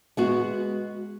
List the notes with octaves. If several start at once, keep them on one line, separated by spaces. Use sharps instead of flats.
G#3 B3 F#4